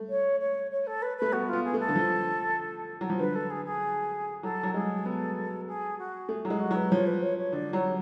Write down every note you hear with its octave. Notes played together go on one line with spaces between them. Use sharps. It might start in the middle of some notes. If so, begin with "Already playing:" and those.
Already playing: A3
C#5
C#5
C#5
A4
B4
A3 B4
B3 F#4
B3 F4
G#4
A3
A4
D3
F3
F#3
F3
D3 B4
A4
G#4
G#4
F#3 A4
F#3
G#3 G#4
B3 A4
G#4
F#4
A3 G#4
F#3 G#4
G#3
F#4
F#3
B4
F3 C#5
B4
C#5
C#5
D3 D5
F#3 C#5